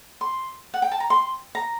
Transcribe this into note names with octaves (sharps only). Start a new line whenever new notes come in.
C6
F#5
G5
A5
A#5
C6
A#5